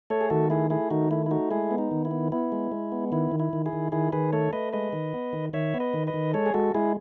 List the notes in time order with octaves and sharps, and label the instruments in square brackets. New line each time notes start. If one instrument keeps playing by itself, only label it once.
[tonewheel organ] A3 A4 C#5
G#4
D#3 F#4 A4
A3 E4 G#4
A3 E4 G#4
D#3 D#4 F#4
A3 E4
E4
A3 D#4 F#4
G#3 E4 G#4
B3
D#4
D#3
E4
B3
B3 E4
G#3
G#3
B3
D#3 E4
D#3
E4
D#3
E4 G#4
D#3
D#3 E4 G#4
D#3 G#4 B4
A3 A4 C#5
A3 B4 D#5
G#3 B4 D#5
D#3
B3
D#3
D#3 C#5 E5
B3
B4 D#5
D#3
B4 D#5
D#3
G#3 A4 C#5
G#4
G#3 F#4 A4
G#3 E4 G#4